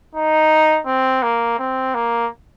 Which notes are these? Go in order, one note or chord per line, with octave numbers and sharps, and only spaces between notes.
D#4
C4
A#3
C4
A#3